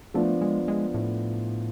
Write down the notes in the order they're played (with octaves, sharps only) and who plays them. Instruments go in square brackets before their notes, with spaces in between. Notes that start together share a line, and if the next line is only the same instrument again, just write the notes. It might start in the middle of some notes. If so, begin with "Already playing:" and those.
[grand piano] F3 B3 D4 [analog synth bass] A3
[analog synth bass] G#3
G#3
A2